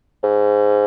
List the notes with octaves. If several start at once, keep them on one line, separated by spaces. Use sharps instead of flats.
G#2